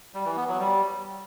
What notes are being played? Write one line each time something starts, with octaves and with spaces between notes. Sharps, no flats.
G3
E3
B3
F#3
G3